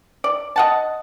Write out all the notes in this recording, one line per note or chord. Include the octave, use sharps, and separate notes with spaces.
D5
D#5 F#5 A5